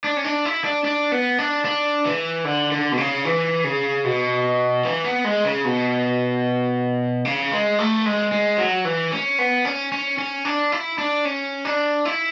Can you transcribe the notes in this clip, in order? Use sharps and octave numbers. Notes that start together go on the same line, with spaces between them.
D4
C#4
D4
E4
D4
D4
B3
D4
D4
E3
D3
D3
B2
C#3
E3
C#3
B2
E3
B3
G#3
C#3
B2
C#3
G#3
A3
G#3
G#3
F#3
E3
C#4
B3
C#4
C#4
C#4
D4
E4
D4
C#4
D4
E4